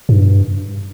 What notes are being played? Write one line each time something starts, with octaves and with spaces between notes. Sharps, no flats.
G2